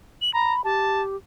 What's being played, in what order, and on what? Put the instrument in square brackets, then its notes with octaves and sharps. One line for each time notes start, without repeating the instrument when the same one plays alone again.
[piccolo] F#7
[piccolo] A#5 [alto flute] B5
[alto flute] G4 [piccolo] A5